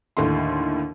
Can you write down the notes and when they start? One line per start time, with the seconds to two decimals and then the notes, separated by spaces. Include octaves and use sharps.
0.17 D#2 A2 D3 C6